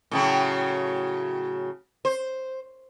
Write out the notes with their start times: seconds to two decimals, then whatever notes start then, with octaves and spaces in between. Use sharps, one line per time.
0.11 A2 C#3 F#3
2.05 C5